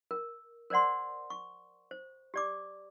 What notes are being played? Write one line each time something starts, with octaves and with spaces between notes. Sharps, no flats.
A#4
A#4 C5 D5 F#5 C6
C#6
C5
G4 D5 D6